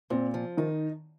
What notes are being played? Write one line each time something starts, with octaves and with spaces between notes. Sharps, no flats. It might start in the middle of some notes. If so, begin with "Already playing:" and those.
A#2 C4
F3
D#3 D#4